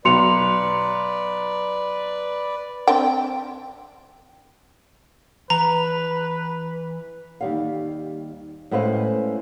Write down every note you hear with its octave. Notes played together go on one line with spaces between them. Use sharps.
B1 B4 D5 C6 C#7 F7
C4 D4 G5
E3 B4 A#5
D#2 G3 F5
A2 G#3 C#4 B4 C5 F5